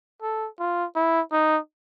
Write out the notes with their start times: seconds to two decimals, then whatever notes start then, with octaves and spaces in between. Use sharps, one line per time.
0.22 A4
0.59 F4
0.95 E4
1.32 D#4